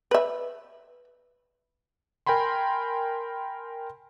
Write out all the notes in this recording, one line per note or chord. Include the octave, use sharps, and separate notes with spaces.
B4 E5
A#4 G5 G#5 B5 C6